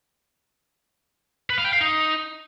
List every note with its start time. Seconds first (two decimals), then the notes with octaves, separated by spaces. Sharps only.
1.50 B4
1.58 F5
1.65 G5
1.73 F5
1.81 D#4